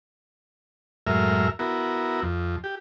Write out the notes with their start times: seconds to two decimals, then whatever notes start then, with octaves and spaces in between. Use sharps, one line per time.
1.07 F#2 A2 G#3 A#4 E5 F6
1.59 B3 E4 F#4 A#4
2.22 F2
2.64 G4